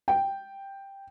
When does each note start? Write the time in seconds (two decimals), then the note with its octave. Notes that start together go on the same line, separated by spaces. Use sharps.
0.08 G5